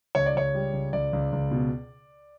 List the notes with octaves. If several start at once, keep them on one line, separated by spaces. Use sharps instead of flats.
C#2 C#5
D5
C#2 C#5
G3
C#2
C#2 D5
C#2
C#2
B2